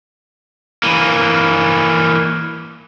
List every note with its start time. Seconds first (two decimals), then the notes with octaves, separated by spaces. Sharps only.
0.83 E3 A#3